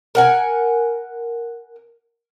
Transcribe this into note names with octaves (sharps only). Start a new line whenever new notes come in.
A#4 F#5 G#5